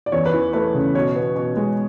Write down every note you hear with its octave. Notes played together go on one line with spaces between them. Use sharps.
D5
E2 C#5
B4
E3
A3 B4
C#3
B2 C#5
B3
B2
G#3